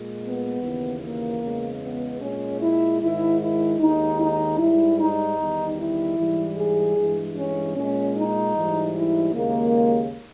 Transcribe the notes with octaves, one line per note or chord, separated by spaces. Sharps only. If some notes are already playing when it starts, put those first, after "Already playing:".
Already playing: A#2 G#3
B3
D#2 C#3 E3
A#3
E2 C#3 G#3
B3
A#2 G#3 C#4
E4
G#2 D#3 G#3 E4
E4
D#2 D#3 G#3 D#4
D#4
G#2 G3 E4
D#4
E2 D#3 G3
E4
G#2 E3 G3
G#4
G2 E3 G#3
C#4
A#2 G#3 C#4
D#4
G#2 E3 G3
E4
D#2 C#3 G#3 A#3